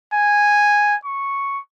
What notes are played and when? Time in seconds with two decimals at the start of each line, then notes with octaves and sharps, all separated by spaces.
0.14 G#5
1.05 C#6